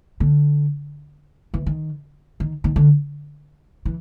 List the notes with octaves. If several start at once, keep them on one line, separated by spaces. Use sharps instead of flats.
D3
E3
D#3
D#3
D#3
D3
E3